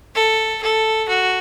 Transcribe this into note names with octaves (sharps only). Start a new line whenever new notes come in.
A4
A4
F#4